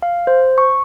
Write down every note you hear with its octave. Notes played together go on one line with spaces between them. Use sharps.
F5
C5
C#6